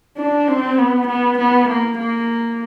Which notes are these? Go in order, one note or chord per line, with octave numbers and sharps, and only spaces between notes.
D4
C4
B3
B3
B3
A#3
A#3